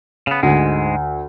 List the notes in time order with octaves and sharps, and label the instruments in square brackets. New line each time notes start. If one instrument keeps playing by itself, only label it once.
[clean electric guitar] C#3 B3
[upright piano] D2 [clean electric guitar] G#2 G#3